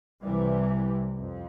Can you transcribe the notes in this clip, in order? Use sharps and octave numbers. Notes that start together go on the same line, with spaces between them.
C2 C3 E3 G3
F2